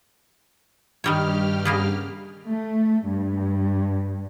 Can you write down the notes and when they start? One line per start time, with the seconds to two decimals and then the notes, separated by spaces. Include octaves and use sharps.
1.04 G2 D#3 G3 G4 C#5 F6
1.65 C#3 A#3 B3
2.49 A3
3.07 G2